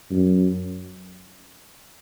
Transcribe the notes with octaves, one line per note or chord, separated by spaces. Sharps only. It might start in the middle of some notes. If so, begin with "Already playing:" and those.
F#2